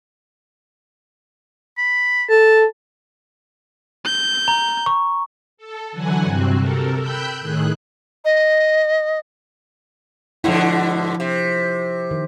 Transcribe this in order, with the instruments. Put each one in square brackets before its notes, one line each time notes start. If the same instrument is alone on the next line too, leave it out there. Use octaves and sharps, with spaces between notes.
[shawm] B5
[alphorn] A4 [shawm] A5
[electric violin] G6
[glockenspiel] A#5
C#6
[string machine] A4
D3 E3 F#3 F#5 G#5
G2 C3 C4 F#4
C3 A4 A#4
G5 B5 E6 F#6 G6
A2 D#3 G#4 F#6
[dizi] D#5
[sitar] G#2 B2 D3 [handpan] F3 E4
[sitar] C3
[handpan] D#3